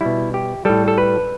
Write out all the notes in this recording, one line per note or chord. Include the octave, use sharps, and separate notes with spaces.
B2 G3 E4
G4
A2 G3 A4
A4
B4